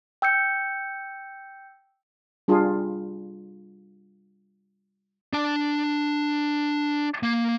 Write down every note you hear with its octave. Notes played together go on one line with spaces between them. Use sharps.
G5 E6 G6 C#7
G3 D4 F4 G#4
D4 A5
A#3